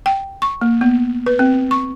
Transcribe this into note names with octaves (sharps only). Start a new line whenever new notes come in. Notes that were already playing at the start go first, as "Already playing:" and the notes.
G5
C#6
A#3
B3
B4
C4
C#6